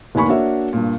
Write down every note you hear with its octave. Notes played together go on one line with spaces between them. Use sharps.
F1 D#2 D#3 G#5 B5 C#6
A#3 D4 F#4 C#5 E5
G2 A#2